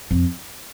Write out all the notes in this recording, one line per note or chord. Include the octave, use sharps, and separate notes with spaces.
F2